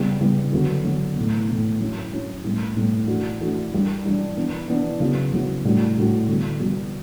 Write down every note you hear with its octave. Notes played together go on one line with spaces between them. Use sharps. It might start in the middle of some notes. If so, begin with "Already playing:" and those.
Already playing: C#3 G3 B3 E4
C#3 G3 B3 E4
D3 F#3 B3 F#4
D3 F#3 B3 F#4
A2 E3 B3
A2 E3 B3
F#3 C#4 E4
F#3 C#4 E4
A2 G3 B3 E4
A2 G3 B3 E4
E3 A3 D4 F#4
E3 A3 D4 F#4
E3 G3 D4
E3 G3 D4
E3 B3 D4
E3 B3 D4
C#3 F#3 B3 E4
C#3 F#3 B3 E4
A2 G3 D4 F#4
A2 G3 D4 F#4
D3 G3 B3 F#4
D3 G3 B3 F#4